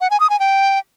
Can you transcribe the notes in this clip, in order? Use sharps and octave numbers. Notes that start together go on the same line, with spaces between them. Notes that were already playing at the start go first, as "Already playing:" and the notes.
F#5
G#5
D#6
G#5
G5